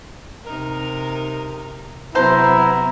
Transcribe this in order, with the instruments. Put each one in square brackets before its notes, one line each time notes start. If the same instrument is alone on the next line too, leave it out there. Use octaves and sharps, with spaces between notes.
[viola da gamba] C3 D#4 A#4
[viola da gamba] C3 F#3 [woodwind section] B3 A#5 [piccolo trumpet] E4 [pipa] A4 C5